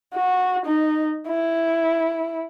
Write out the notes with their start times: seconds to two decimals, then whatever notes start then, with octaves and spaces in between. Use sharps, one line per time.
0.15 F#4
0.66 D#4
1.28 E4